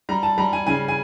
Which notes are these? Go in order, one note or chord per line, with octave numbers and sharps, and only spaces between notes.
G3 A#5
A5
G3 A#5
G#5
C#3 G#5
G#5